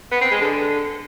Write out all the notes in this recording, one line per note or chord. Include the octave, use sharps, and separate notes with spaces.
B3
C4
G#3
D3